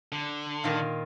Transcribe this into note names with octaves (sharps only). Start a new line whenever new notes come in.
D3
A#2 D#3 F5